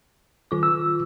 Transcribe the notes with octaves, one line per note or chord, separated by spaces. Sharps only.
D#3 F4 D6
E6